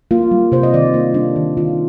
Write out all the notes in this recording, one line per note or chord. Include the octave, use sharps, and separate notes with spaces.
A#3 F4
G3
C3 C5
D#5
D#3 D5
A#3 F4
G3 D4
D#3
D#3 F4